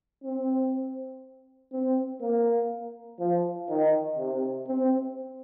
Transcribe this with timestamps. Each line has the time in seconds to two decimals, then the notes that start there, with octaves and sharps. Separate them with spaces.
0.24 C4
1.73 C4
2.21 A#3
3.19 F3
3.69 D#3
4.18 C3
4.68 C4